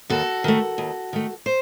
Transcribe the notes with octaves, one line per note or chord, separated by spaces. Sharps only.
D#2 F#4 A4
D#3 A3
D#2
D#3 A3
C5